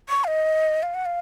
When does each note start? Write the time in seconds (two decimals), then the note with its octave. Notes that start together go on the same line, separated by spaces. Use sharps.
0.09 C#6
0.24 F5
0.28 D#5
0.83 F5
0.94 F#5
1.06 F5